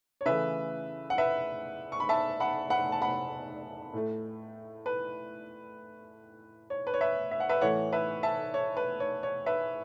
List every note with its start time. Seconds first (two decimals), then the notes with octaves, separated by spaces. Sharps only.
0.21 C#5
0.26 C#3 E3 A3 B4 E5
1.10 F#5
1.18 B4 E5
1.92 C#6
2.00 B5
2.09 E5 A5
2.40 F#5 B5
2.70 F#5 B5
2.92 A5
3.02 F#5 B5
3.94 A2 A3
4.86 B4
6.70 C#5
6.87 B4
6.94 C#5
7.01 B4 E5
7.31 E5
7.40 F#5
7.49 B4 E5
7.61 A2 E3 A3 C#5 F#5
7.93 B4 E5
8.23 E5 A5
8.54 C#5
8.77 B4
9.00 C#5
9.23 C#5
9.46 B4 E5